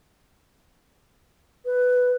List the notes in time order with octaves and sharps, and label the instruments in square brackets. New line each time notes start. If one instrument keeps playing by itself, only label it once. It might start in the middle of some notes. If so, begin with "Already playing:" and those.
[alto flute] B4